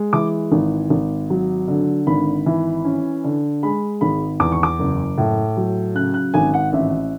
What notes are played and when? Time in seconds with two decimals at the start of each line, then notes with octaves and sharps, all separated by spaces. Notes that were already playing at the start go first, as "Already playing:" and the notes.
Already playing: G#3
0.13 E3 D6
0.52 G#1
0.90 G#1
1.30 F#3
1.68 D3
2.07 G#1 B5
2.46 E3
2.84 C#4
3.24 D3
3.63 G#3 B5
4.01 G#1 B5
4.40 E2 D6
4.52 C#6
4.63 D6
4.79 F#1
5.18 A2
5.57 F#3
5.95 C#3 F#6
6.14 F#6
6.34 G#1 G#5
6.54 F#5
6.73 A1 E5